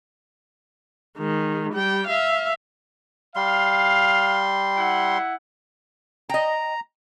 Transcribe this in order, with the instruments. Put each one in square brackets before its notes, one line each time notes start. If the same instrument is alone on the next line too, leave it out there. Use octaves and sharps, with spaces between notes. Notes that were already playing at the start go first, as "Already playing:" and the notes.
[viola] D#3 G#3
G3 G5
E5 F5
[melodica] G3 C6 [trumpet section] F5
[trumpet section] E4 F#5
[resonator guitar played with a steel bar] D#5 G5 [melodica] A#5